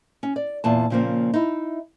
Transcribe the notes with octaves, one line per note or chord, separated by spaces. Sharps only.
C#4
D5
E2 A#2 A5
A#2 C#3 F3 G3 A#3 C4
D#4 E4